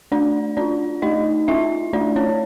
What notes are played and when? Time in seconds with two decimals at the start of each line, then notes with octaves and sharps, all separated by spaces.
0.12 A3 D4 D5
0.57 C#4 D4 F4 D5
1.02 A3 D#4 D#5
1.48 C#4 E4 F4 E5
1.93 A3 D4 D5
2.16 C#4 C#5